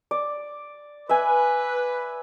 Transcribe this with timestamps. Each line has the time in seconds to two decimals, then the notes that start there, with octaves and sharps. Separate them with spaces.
0.11 D5
1.09 B4 E5 G#5